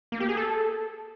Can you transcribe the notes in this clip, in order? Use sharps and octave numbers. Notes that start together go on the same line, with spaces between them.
A#3
G4
G#4
A4